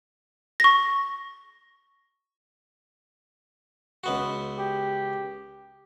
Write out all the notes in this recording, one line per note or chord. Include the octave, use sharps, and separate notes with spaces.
C#6 A#6
C#2 B3 F#4
G4